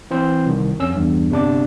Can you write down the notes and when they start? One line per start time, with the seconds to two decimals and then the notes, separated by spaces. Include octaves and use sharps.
0.11 E3 C4 C5
0.46 C2 D#3
0.79 F2 C#4 E6
0.94 E2 G2
1.31 G1 C3 D4 D6